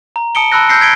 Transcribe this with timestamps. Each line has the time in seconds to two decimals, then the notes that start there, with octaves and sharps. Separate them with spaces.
0.16 A#5
0.35 A5 D#6 C#7 D7 G7
0.52 A5 B5 E6 F#6 A#6
0.69 E6 G6 A#6 C7 C#7
0.81 G#6 B6 D7 G7